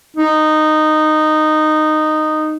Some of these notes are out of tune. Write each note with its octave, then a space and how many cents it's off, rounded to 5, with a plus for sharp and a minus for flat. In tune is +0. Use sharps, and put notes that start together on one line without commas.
D#4 -10